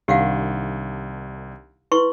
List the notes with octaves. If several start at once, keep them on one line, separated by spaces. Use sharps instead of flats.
C2 D#3 D4 G4 F5 F#5
E4 B4 C6 C#6